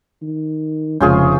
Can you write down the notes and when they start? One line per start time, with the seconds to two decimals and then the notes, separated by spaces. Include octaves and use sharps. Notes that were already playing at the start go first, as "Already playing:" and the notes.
0.22 D#3
1.01 F1 C#3 G#3 C#4 F4 G#4 G6